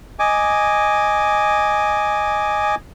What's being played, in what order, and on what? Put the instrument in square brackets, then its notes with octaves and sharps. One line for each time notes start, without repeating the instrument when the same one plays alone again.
[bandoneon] D#5 G#5 D6